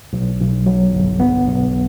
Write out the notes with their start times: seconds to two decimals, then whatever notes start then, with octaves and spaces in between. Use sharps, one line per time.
0.13 B1
0.40 B1
0.66 F#3
0.92 G1
1.20 B3
1.47 B1